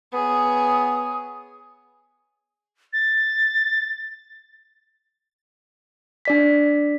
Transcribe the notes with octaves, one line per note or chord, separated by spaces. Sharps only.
B3 G#4 C#5 D#6
A6
D4 D5 B6